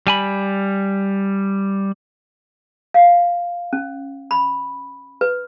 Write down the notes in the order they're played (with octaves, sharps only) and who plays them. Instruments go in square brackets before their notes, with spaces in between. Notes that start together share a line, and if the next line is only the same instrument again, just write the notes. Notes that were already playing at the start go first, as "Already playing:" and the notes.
[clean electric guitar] G3 G#5 B5
[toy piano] F5
C#4
B5
B4